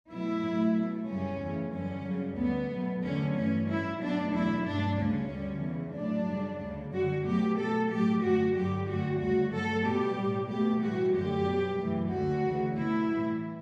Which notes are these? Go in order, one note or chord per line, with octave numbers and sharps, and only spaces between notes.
B2 F#3 A3 E4
A2 F#3 A3
B2 A3
F#2 C#3 G3 C#4
E2 C#3 E3 A3
F#2 D3 G3 C#4
F#2 C#3 G3
D2 D3 G3 B3
B2 F#3 A3
E2 D3 F#3 A3 C#4
G2 E3 A3 C#4
A2 G3 E4
B2 F#3 A3 D4
E2 B2 F#3 A3 E4
G2 F#3 A3 D4
D2 C#3 G3 C#4
D2 D3 G3
E2 C#3 E3
A2 F#3 A3 D4
F#2 C#3 G3
D2 C#3 G3
F#2 D3 G3 F#4
B2 F#3 A3 G4
B2 A3 A4
A2 F#3 A3 G4
F#2 D3 A3 F#4
G2 D3 F#3 G4
F#2 D3 A3 F#4
D2 C#3 G3 F#4
G2 F#3 A3 A4
B2 G3 G4
A2 G3
B2 A3 G4
A2 E3 G3 F#4
F#2 D3 A3 G4
B2 G3
F#2 E3 A3
D2 D3 A3 F#4
D2 C#3 E3
B2 A3 E4
A2 E3 G3